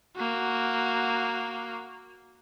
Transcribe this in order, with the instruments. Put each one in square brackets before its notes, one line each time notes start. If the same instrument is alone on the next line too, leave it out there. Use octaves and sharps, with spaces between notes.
[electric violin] A#3 F#4